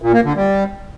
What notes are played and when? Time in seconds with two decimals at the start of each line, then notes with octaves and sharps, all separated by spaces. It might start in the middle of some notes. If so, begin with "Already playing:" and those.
0.02 A#2
0.13 A#3
0.25 D3
0.36 G3